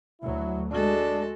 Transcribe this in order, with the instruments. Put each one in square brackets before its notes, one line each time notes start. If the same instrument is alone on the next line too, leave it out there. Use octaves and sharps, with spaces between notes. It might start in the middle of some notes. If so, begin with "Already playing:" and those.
[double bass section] D2 F#3 [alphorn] E4
[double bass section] G#3 [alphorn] D4 [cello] F#4 A4